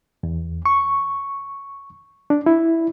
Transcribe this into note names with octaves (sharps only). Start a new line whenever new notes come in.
E2
C#6
D4
E4